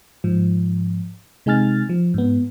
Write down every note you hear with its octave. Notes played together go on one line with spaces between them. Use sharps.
G#2 F3
C3 G#3 D#4 G#5 F6 A6
F3
G#2 B3